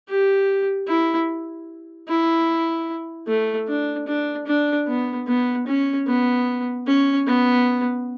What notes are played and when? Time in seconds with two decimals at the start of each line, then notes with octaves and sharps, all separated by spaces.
0.08 G4
0.88 E4
2.08 E4
3.28 A3
3.68 D4
4.07 D4
4.47 D4
4.87 B3
5.28 B3
5.67 C#4
6.07 B3
6.87 C#4
7.27 B3